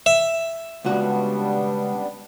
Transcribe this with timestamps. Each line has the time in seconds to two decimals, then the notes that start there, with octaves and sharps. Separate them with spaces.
0.06 E5
0.84 C#2 G3 B3 D4 F#4